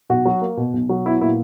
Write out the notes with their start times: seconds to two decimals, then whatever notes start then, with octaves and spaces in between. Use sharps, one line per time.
0.10 B1 F#4
0.26 F#3
0.41 A#3
0.57 B2
0.74 B1
0.89 F#3
1.06 B3 E4
1.21 A#2 E4